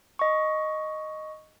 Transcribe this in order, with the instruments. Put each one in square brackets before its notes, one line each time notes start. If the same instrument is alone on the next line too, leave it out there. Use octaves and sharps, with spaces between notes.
[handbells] D#5 C#6